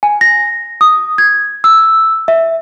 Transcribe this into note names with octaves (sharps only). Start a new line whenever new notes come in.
G#5
A#6
D#6
G#6
E6
E5